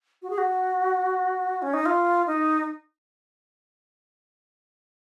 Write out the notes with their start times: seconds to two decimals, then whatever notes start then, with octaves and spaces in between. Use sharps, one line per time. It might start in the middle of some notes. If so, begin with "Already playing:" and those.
0.22 F#4
0.30 G#4
0.38 F#4
1.62 C#4
1.73 D#4
1.85 F4
2.27 D#4